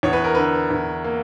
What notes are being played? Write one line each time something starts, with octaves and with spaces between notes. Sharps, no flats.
E2 C#5
B4
A#4
D3 B4
E2
A#3